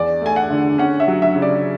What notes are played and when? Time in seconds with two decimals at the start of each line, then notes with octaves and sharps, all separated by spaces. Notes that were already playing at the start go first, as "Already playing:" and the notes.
Already playing: E2 D5
0.22 A3 G#5
0.36 F#5
0.50 D3
0.78 C#4 F#5
1.00 E5
1.08 F#3
1.22 E5
1.35 C#3
1.42 D5